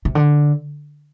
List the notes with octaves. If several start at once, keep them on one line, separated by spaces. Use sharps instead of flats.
C3
D3